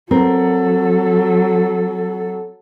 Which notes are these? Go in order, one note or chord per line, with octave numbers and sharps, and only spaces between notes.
F#3 C4 A4 A#4